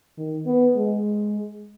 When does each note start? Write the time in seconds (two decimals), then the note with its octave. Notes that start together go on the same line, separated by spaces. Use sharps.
0.17 D#3
0.46 B3
0.76 G#3